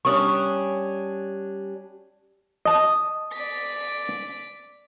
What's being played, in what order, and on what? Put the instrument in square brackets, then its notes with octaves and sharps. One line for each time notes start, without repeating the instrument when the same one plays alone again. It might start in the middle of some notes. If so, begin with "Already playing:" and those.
[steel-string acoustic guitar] G3 C#4 D4 [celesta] C#6 D#6
[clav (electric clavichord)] D#5 A5
[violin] D5 B6